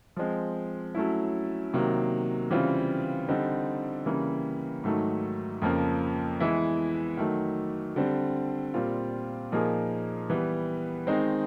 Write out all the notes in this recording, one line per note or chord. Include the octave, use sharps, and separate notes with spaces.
F3 G#3 C4
F#3 A3 C#4 E4
C3 D#3 F#3 A#3
C#3 E3 G3 C4 F4
D3 G3 C4 D#4
C#3 E3 G3 A#3
G#2 D#3 F#3 A3
F2 C#3 F3 A#3
E3 G#3 B3 E4
D#3 F#3 A3
D3 G3 C4
A#2 G3 C4 F4
A#2 F3 A#3 D#4 G#4
E3 G3 B3
D#3 G#3 C4 D#4